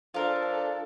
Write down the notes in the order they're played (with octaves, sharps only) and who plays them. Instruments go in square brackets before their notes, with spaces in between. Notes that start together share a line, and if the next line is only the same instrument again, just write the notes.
[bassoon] F3 [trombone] D4 [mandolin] F4 A#4 [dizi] A4